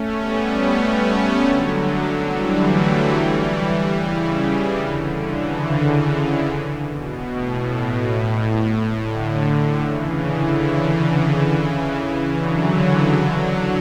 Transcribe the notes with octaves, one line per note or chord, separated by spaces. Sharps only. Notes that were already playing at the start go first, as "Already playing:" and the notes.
Already playing: A3 C#4
G3 B3
A3 C#4
A3 C#4
D3 F#3
E3 G3
F#3 A3
E3 G3
C#3 E3
D3
C#3 E3
D3
B2
A2
B2
A2
D3
C#3 E3
D3
C#3 E3
D3 F#3
D3 F#3